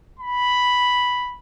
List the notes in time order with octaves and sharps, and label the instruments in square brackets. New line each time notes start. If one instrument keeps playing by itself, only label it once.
[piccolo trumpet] B5